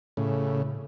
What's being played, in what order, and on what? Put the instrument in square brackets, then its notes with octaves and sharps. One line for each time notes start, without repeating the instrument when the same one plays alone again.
[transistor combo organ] A2 C#3